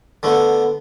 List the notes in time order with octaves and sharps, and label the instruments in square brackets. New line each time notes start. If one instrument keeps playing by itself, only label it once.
[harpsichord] D3 A3 B3